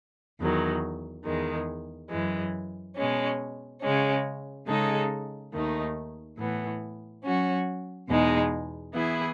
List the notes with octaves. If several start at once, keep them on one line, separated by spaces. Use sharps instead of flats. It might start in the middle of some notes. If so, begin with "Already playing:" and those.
E2 D#3 F#3
E2 D#3 G#3
F#2 E3 G#3
B2 G#3 C#4
C#3 G#3 C#4
C#3 G#3 D#4 A4
D#2 D#3 A3 D#4
A2 E3 B3
F#3 C#4 F#4
E2 B2 G#3 D#4
E3 B3 E4 G#4